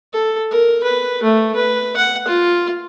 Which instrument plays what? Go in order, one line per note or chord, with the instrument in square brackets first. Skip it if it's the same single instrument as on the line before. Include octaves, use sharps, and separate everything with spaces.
[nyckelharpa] A4
A#4
B4
A3
B4
F#5
F4